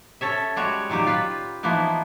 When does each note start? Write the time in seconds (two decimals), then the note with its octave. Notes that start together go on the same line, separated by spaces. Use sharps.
0.21 C#4 A4 C#5 E5
0.56 G3 G#3 F#4 C#5
0.90 A#2 D#3 F#3 G4
1.07 F4 B4
1.63 E3 F3 A#3 B3 D#4